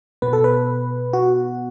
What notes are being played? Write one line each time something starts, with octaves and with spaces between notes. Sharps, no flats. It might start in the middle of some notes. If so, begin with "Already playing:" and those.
B2 B3 B4
A4
B4
F#4